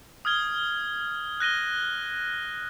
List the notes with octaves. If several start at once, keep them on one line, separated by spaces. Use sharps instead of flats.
D#6 F6 G#6 G7
F#6 A#6 D#7 G7